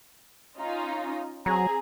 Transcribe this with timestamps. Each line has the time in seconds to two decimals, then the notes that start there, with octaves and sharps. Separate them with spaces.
0.58 C#4 D#4 F4
1.46 F#3 C4 G#4 A#5